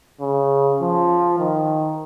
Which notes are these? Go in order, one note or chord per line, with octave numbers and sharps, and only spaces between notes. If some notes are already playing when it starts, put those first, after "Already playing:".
C#3
F3
D#3